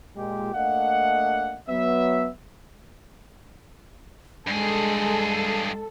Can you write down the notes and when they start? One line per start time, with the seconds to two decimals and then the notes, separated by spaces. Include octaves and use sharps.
0.16 A#2 G#3 G4
0.54 A3 A#3 D4 D#5 F5 F#5
1.69 F#3 B3 E5
4.47 G2 G#3 G#4 A4